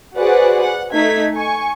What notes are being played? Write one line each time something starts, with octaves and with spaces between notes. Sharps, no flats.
F#4 G#4 B4 C5 D5 F#5
F#5
A3 D#4 G#6 B6
G#5 C#6